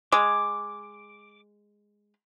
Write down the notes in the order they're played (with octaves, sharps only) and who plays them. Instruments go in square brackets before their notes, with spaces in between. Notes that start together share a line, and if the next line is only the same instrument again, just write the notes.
[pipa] G#3 [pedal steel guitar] D6